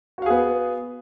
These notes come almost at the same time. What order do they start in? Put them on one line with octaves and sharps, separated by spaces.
F#4 F5 G#4 B3